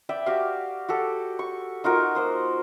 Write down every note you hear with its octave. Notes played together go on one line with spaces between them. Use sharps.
B4 D5 E5 G5
F#4 G4 F5
F#4 G4 A4
C#6
D#4 F4 F#4 A#4
A#3 C5 D#6